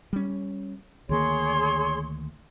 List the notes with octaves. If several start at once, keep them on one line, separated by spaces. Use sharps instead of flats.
G3 C#4
D2 D#3 A#3 G#4 C#5 C6